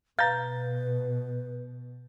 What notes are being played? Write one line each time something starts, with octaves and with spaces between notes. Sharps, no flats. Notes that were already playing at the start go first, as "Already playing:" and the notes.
B2 B4 F5 A#5 G6 A6